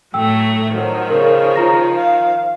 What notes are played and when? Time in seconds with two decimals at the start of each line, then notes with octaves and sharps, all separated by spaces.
0.14 A2 F#3 A3 G5 E6
0.72 D#3 F3 F#3
1.10 C#3 A#4
1.56 F4 A#5 A#6
1.96 F5